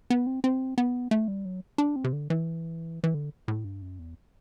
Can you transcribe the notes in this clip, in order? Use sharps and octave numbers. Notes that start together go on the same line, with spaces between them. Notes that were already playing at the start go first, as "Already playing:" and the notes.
B3
C4
C4
B3
A3
G3
F#3
D4
C4
C3
D3
E3
E3
D3
A2
G2
F#2
E2